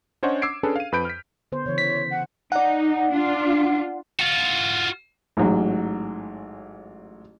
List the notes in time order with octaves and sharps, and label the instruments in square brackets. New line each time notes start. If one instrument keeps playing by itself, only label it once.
[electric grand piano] C#4 D4 C5 C#5 D#5 F#5
D6 E6 G#6 C7 D7
C#4 D4 G#4 A4 B4
F5 D#7
F2 B4 B5 G6 D7
F6 B6
[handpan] D3 B3 C5
[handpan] C#3 E3 [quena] C#5
[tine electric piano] B6
[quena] F#5
[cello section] D#4 [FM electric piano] D5 F#5
[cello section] D4 F4
[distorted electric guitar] F4 F#4
[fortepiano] A1 G#2 F#3